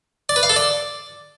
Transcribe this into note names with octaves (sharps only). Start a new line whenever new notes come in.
D5
B4
F5
A4
D5